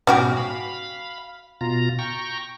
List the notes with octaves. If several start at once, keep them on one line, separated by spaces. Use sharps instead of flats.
G#2 B2 C#4 F#4 G4
F5 B5
B2 F4 A#5
G5 A#5 C#6